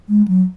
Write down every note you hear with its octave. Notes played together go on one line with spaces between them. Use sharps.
G#3
F#3